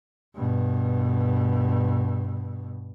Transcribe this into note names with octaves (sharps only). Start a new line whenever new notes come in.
G2 B2